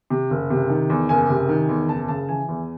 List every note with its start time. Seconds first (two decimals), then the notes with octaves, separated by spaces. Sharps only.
0.10 C3
0.30 F#1
0.50 C3
0.70 D#3
0.90 E2
1.09 F#1 G#5
1.29 C3
1.49 D#3
1.69 E2
1.89 F#1 A5
2.08 C#3 A5
2.29 E3 G#5
2.48 E2